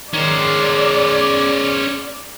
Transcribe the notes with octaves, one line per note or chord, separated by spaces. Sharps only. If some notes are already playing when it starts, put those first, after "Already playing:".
D#3 G#3 C#4 C5 D5